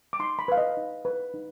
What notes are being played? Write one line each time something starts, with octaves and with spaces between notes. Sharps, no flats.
D6
D#4 C6
B5
B4 F5
D#5
D#4
B4
D#4